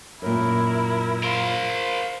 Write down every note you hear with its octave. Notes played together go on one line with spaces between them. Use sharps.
F#2 A#2 E4 A#4
A#4 C5 F5